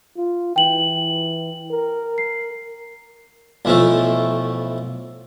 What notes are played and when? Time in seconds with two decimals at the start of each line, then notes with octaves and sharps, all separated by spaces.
0.17 F4
0.56 E3 G5 F#7
1.71 A#4
2.18 C7
3.65 B1 E3 F3 A3